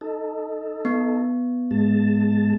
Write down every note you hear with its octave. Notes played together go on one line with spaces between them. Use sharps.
D#4 A4
B3
G#2 G#3 A5